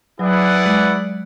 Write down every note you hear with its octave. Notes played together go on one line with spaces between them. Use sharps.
F#3 E4 G#4 B4 D5 F#5
G#3